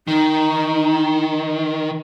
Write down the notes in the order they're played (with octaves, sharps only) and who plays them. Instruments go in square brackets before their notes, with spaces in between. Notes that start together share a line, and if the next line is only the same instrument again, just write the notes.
[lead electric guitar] D#3 [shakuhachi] D#4